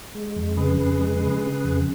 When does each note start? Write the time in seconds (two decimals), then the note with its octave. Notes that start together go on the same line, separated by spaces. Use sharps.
0.15 G#3
0.36 F2
0.57 C#3 G#4 B4
0.78 F2
0.99 G#3
1.20 C#3
1.42 C#3
1.64 F2